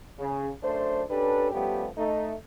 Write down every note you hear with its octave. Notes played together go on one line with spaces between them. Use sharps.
C#3
F#2 A3 D4 C5
C#4 D4 G4 A4 B4
F3 G3 A3 B3 C#4 G4
A3 D#4